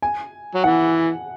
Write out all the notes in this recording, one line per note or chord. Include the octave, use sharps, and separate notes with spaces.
G#5
F#3
E3 F#5